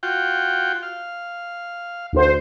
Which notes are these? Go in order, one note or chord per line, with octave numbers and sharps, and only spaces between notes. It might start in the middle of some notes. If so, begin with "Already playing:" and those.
F4 F#4 G5
F5
D2 C5